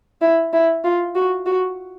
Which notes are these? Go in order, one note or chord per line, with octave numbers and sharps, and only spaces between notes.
E4
E4
F4
F#4
F#4